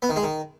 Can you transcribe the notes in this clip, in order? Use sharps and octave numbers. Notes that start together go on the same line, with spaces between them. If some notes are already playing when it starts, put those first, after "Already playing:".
B3
D#3
G#3
D#3